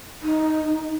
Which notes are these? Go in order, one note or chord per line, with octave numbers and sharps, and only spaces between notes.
D#4